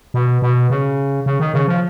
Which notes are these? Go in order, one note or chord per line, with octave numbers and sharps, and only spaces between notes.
B2
B2
C#3
C#3
D#3
C#3
F3